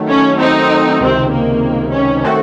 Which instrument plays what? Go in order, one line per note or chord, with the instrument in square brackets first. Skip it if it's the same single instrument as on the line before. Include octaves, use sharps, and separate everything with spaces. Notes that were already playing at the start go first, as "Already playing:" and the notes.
Already playing: [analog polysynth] D#3 F#3 A3
[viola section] C#4
C4 D#4
[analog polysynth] C#2 C3 D#3 [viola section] C4
[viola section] A#3
C#4
[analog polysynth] D#3 A3 C4 F#4 A4